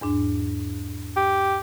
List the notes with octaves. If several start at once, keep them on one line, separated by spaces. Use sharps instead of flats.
E2 G#2 D4
G4